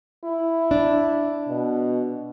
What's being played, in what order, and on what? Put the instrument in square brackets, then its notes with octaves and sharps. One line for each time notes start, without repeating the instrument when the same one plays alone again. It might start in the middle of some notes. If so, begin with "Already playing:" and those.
[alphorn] E4
[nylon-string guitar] D4
[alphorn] B2